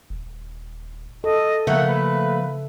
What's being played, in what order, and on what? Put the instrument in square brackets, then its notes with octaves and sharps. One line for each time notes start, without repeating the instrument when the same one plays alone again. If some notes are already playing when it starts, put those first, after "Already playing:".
[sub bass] D#1
[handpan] A4 [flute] D#5
[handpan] C#3 E5 [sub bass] F3 [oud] A3 A#3 [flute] F#5
[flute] B4